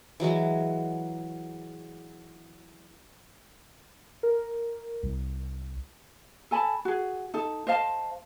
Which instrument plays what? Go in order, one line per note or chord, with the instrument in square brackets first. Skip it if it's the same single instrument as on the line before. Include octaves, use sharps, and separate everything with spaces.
[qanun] E3 F#3 G#3 F#4
[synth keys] A#4
C2
[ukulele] A4 G#5 A5 B5
F#4 G#4
D#4 A4
C5 D#5 F5 A5